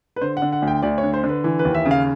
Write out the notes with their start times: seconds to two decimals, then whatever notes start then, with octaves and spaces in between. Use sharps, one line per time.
0.16 B4
0.21 D3 C5
0.37 F#5
0.42 D3
0.52 F#5
0.62 D2
0.67 G5
0.82 D2 D5
0.98 C#5
1.03 D3
1.14 C5
1.24 D3
1.29 B4
1.44 E3
1.59 B4
1.65 D#2
1.75 E5
1.85 C#3
1.91 F5